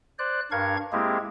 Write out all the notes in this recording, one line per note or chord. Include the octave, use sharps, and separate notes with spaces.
C5 D5 F#6
G2 D4 A#4 F5 C#6 G#6
G#3 A#3 C4 E4 G4 G#4